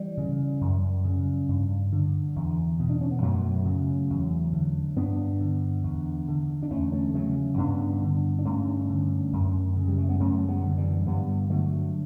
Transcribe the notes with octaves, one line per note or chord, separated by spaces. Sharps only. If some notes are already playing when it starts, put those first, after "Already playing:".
Already playing: E3 G3
C#3
F#2
C#3
G2
D3
E2
B2
D4
C#4
B3
F#2 F#3 A3
C#3
E2
D3
G2 B3 D4
D3
E2
D3
D4
E2 A3 C#4
A3 C#4
C#3 F#3 A3
G2 B3 D4
D3
D4
G2 A3 C#4
D3
F#2
C#3
G3
A3
B3
F#2 A3 C#4
G3 B3
D3
E3 G3
G2 G3 B3
D3 F#3 A3